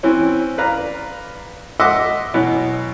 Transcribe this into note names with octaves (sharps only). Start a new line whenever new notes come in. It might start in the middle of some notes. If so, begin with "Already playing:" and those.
E3 C4 C#4
B4 D5 F5 A#5
D#5 E5 F#5 C6 D6 E6
B2 E3 F#3